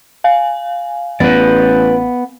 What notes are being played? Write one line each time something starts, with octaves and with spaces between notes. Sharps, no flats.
F5 G#5
A1 B3 B4 D5